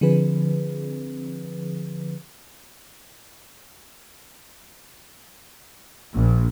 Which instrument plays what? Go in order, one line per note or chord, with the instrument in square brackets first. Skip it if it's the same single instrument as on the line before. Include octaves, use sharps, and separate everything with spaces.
[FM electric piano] D3 F3 C4 G#4 B4
[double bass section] A#1